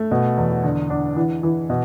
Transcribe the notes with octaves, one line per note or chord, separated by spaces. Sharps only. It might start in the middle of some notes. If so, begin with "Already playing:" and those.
Already playing: A3
B2
E2
D3
D4
E3
E3
B2